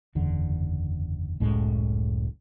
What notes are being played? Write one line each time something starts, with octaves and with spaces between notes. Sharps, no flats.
F#1 E2 D3
F#1 C#2 A2 G#3